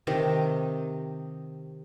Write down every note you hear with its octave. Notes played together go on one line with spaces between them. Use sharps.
C3 D#3 G4 D#5